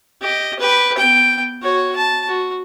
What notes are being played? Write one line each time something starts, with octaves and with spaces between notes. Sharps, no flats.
G4 D#5
G4 B4
B3 G5
F#4 C#5
A5
F#4